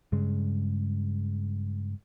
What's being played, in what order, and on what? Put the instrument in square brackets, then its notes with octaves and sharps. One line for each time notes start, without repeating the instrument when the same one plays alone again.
[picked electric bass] G2 C#3 G#3